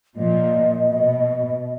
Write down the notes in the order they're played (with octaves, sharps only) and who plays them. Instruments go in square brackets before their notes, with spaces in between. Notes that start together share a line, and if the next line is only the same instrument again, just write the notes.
[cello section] A#2 F3 [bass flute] D#5
[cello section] B2